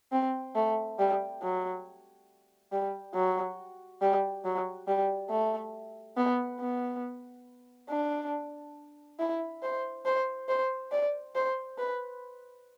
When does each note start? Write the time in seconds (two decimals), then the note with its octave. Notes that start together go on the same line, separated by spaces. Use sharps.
0.12 C4
0.56 A3
0.99 G3
1.42 F#3
2.72 G3
3.14 F#3
4.01 G3
4.45 F#3
4.88 G3
5.30 A3
6.17 B3
6.60 B3
7.89 D4
9.19 E4
9.63 C5
10.05 C5
10.49 C5
10.92 D5
11.35 C5
11.78 B4